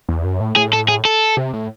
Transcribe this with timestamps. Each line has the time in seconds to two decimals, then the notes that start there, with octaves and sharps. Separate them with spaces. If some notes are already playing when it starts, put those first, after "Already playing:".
0.09 E2
0.24 F#2
0.40 A2
0.56 A2 G#4
0.73 A4
0.88 G#4
1.05 A4
1.37 C3
1.53 A2